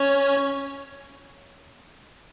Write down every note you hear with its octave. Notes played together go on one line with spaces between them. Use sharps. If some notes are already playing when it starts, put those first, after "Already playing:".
Already playing: C#4 C#5